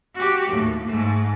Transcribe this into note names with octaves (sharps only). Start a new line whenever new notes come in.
F#4 G4
D#2 A2
G#2 A3